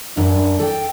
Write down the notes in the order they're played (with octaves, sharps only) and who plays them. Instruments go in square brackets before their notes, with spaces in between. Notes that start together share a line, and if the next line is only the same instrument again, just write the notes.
[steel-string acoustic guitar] F#2 [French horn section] D4
[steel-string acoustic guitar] A4 G5